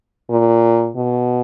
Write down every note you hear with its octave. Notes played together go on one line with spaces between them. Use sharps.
A#2
B2